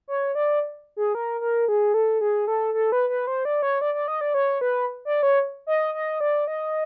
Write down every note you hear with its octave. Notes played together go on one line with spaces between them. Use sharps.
C#5
D5
G#4
A#4
A#4
G#4
A4
G#4
A4
A4
B4
B4
C5
D5
C#5
D5
D5
D#5
D5
C#5
B4
D5
C#5
D#5
D#5
D5
D#5